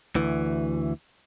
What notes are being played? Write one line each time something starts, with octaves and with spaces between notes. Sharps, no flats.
D2 E3